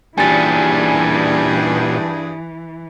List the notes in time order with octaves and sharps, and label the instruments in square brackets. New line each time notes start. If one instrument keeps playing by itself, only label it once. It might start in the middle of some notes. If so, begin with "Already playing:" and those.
[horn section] G2 G#4 [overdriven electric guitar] A#2 G3 [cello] E3 [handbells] G#5 A6